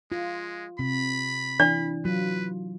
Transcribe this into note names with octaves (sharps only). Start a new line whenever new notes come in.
G#3 F4
C3 B5
E3 D4 D5
F#3 F4 B4